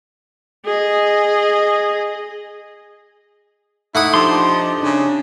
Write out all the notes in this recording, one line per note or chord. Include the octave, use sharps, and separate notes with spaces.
G#4 D#5
A3 D#4 E4 F#5 D#6
F3 D4 G4 C6
C#3 D4